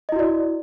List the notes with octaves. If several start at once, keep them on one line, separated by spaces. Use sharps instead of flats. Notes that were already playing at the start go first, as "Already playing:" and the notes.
E4 F#4 D5 D#5